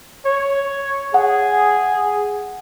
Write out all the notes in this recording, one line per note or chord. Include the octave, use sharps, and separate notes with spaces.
C#5
G#4 F#5